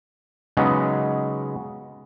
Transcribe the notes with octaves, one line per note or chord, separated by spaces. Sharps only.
C#3 F#3 G#3 B3 C#4 D#4